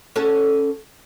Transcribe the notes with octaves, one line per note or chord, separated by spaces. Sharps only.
C#4 F#4 A4